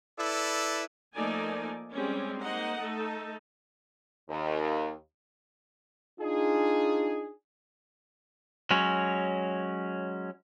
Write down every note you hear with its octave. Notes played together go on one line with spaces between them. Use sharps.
E4 A4 B4 D5
F3 A3 A#3 D#4 D5 G#5
G3 G#3 C4 C#4
A#3 D#4 C5 D#5 F#5 A#5
A3 D#4 A4
D#2
D4 D#4 F4 G#4
F#3 G#3 C#4